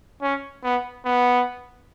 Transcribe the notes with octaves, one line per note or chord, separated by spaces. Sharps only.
C#4
B3
B3